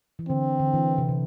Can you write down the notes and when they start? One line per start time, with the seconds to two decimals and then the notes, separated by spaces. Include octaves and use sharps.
0.19 E3
0.29 D3 C4
0.59 D3
0.74 E3
0.98 C3
1.09 C3